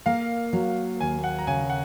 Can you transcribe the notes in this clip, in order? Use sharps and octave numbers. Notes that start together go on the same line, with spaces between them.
A#3 F5
F#3
D#2 G#5
F#5
A#5
C#3 G#5
F#5